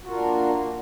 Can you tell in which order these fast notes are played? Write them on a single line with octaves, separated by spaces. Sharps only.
F#4 F4 A#4 D4 A#3